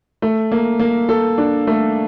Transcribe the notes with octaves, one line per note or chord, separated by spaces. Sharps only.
A3
A#3
A#3
A4
D4
A3